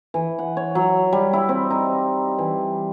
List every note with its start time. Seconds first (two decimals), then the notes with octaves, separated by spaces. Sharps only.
0.14 E3
0.39 F#5
0.57 C#5
0.75 F#3
1.13 G3
1.33 E4
1.49 C4
1.70 D#4
2.38 E3